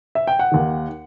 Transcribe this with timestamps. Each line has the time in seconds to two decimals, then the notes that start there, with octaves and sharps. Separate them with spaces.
0.15 E5
0.27 G5
0.39 F#5
0.52 D#2 D#3